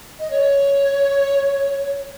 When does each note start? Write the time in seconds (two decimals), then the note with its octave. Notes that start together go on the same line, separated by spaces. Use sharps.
0.19 D#5
0.30 C#5